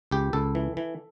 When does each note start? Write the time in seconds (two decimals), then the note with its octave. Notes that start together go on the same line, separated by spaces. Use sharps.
0.11 C#2 G4
0.33 C#2 A4
0.55 E3
0.77 E3